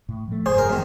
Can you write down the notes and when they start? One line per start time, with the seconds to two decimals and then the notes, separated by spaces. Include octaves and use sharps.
0.09 A2
0.28 F3 A3
0.46 F#1 G#2 G#4 C5
0.58 A#4
0.69 F#2 D#3 G#3 B3